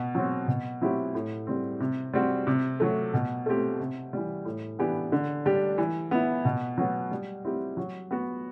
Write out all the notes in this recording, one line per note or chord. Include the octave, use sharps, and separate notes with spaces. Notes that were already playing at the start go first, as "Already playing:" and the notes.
Already playing: B2
F#3 C4
B2
F#3 C4 E4 G4
A2
G3 C4
C3
G3 C4 F#4
C3
F#3 A3
B2
A3 C4 G4
C3
E3 G3
A2
E3 B3 D4 G4
D3
G3 D4 G4
E3
B3 E4
B2
F#3 B3 F#4
G3
C4 E4 G4
F#3
B3 F#4